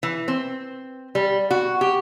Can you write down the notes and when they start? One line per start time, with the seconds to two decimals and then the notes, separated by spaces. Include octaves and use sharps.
0.03 E3
0.28 C4
1.15 G3
1.51 F#4
1.81 G4